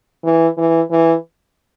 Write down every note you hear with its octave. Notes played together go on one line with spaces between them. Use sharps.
E3
E3
E3